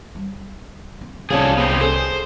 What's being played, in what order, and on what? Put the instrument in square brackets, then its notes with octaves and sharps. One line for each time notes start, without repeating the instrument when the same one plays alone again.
[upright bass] G3
C4
[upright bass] C2 [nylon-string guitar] F3 C#4 [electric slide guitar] G#4 A4 D5
[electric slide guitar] B3 C4 G4
[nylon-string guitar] G#4 A4 [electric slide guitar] C5